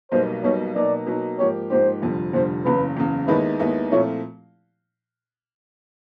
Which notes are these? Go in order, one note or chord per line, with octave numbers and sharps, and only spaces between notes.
B1 B2 G3 A#3 D#4 C5
B1 B2 G3 A#3 D#4 C#5
B2 F#3 A#3 D#4 D5
B2 F#3 A#3 D#4
G#2 F3 A#3 D#4 G4 C#5
G#2 F3 A#3 D#4 G4 C5
F1 F2 D3 G3
F1 F2 D3 G3 C5
F#1 E2 C#3 B4
F#1 E2 C#3
D#2 D#3 G#3 B3 E4 B4
D#2 D#3 G#3 B3 E4
A#2 F3 A3 C4 E4 C#5